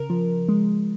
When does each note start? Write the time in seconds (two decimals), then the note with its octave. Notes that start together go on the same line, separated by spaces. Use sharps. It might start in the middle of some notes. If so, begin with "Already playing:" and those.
Already playing: C#3 A#4
0.10 F3
0.49 G#3